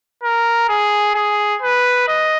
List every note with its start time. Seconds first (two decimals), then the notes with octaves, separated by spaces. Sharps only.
0.23 A#4
0.69 G#4
1.15 G#4
1.62 B4
2.08 D#5